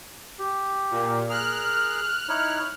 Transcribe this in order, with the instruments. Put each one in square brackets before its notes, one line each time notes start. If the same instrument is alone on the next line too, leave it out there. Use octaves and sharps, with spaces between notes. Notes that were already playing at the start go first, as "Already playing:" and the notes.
[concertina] G4
[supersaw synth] A#2
[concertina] G#4 A#4 [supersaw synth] F6 F#6
[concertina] D#4 E4 C#5